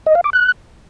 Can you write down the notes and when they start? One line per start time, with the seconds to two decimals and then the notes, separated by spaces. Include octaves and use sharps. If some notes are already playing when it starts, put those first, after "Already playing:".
0.06 D#5
0.15 F5
0.24 D6
0.33 F#6